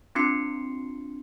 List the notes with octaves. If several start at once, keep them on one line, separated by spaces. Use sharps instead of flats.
C4 D4 F4 C6 C7 C#7